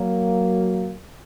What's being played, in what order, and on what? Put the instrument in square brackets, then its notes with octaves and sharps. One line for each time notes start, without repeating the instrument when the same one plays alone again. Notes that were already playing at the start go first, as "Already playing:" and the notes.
Already playing: [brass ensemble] F#3 A#3